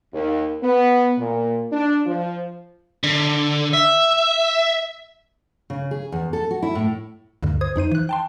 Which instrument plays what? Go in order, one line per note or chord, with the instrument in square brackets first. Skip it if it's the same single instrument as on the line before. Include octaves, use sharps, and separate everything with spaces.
[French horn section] D#2
B3
A#2
D4
F3
[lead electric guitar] D3
E5
[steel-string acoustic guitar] C#3
G#4
E2
A4
F#4
E4
A2
[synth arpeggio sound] D2 G2 D3
C5 D#6 G#6
F2 D#4 C5 D#7
E3 F#6
G5 A5 C6